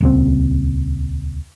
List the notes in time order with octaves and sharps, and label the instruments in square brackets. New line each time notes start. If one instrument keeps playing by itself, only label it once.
[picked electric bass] D#1 C#2 C4